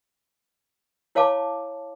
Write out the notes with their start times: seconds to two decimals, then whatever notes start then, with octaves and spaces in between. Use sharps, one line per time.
1.15 E4 C#5 F5 A5 D6